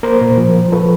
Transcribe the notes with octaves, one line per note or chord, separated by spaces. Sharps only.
A#3 A#4 C5
A#2
F3
F3
F3 A4 B4